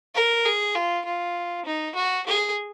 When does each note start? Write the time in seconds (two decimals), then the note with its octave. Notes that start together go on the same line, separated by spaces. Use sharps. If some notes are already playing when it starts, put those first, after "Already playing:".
0.15 A#4
0.45 G#4
0.75 F4
1.05 F4
1.65 D#4
1.95 F#4
2.26 G#4